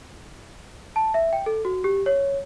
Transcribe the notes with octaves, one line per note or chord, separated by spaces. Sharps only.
A5
E5
G5
A4
F#4
G4
C#5